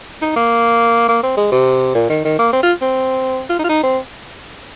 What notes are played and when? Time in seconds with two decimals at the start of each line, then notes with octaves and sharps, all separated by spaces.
0.22 D#4
0.36 A#3
1.08 A#3
1.23 C4
1.37 G#3
1.52 C3
1.95 A#2
2.10 D#3
2.25 D#3
2.39 A#3
2.53 C4
2.63 F4
2.82 C4
3.49 F4
3.59 D#4
3.64 F4
3.69 D#4
3.83 C4